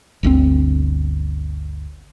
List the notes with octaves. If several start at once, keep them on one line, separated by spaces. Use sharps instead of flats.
G1 D2 C#3 C4